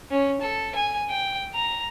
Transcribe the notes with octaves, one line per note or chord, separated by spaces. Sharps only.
C#4
A4
G#5
G5
A#5